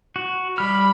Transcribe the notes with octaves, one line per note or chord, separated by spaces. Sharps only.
F#4
G3 B5 F6